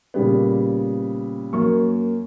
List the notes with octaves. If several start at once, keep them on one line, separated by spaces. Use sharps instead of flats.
A#2 C#3 G3 B3
F#2 A#3 C#6